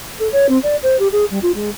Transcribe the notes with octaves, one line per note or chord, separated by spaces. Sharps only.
A4
C#5
C4
D5
C5
G4
G#4
G3
F4
G#3